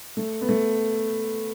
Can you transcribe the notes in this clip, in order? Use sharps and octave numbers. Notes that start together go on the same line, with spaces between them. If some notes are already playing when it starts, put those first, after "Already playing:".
A3
B3
A3